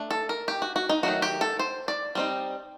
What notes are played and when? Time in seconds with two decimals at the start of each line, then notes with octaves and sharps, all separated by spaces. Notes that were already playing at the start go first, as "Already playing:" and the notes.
Already playing: A3 D4
0.11 A4
0.29 A#4
0.48 G4
0.62 F#4
0.76 F#4
0.89 D#4
1.03 D#3 F#3 A3 D#4 F#4
1.22 G4
1.41 A4
1.59 C5
1.88 D5
2.15 G3 C4 D#4